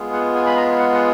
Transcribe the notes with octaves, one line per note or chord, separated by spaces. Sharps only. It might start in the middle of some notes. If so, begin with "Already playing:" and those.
Already playing: G#3 B3 F4 G#4
F#5
G#5
B5
A#5
F#5
F#5